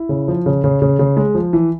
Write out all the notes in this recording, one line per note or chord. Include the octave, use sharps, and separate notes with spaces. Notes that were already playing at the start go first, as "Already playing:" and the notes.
Already playing: E4
C#3
F3
C#3
C#3
C#3
C#3
G#3
F3
E3